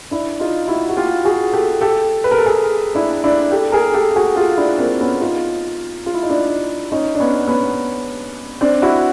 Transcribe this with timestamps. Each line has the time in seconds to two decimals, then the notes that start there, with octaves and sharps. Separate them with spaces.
0.11 D4 E4
0.40 D#4 F4
0.68 E4 F#4
0.89 F#4
0.97 F4 G4
1.25 F#4 G#4
1.53 G4 A4
1.81 G4 A4
2.24 B4
2.31 A#4
2.38 A4
2.46 G#4 A#4
2.95 D4 E4
3.24 D4 E4
3.52 G4 A4
3.72 G#4 A#4
3.94 G4 A4
4.16 F#4 G#4
4.36 F4 G4
4.57 D4 E4
4.78 A#3 C4
5.01 B3 C#4
5.21 D#4 F4
6.06 F4
6.14 E4
6.23 D#4
6.29 D4 E4
6.92 C#4 D#4
7.15 D4
7.20 B3 C#4
7.48 B3 C#4
8.61 C4 D4
8.82 E4 F#4